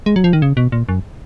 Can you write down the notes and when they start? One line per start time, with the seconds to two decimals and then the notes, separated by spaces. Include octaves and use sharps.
0.06 G#3
0.16 F#3
0.24 F3
0.33 D#3
0.42 C#3
0.57 B2
0.72 A#2
0.89 F#2